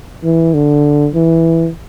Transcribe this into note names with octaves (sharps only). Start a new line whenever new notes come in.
E3
D3
E3